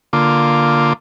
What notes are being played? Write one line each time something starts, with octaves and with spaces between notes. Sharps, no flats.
D3 A#3 F4 D6